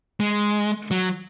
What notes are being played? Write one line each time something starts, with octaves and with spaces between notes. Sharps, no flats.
G#3
F#3